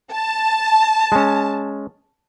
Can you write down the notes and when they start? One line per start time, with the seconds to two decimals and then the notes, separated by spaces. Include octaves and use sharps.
0.14 A5
1.12 G#3 C#4